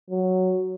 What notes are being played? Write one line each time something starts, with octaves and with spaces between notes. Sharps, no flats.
F#3